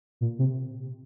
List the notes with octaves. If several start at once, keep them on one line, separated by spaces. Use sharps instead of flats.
A#2
C3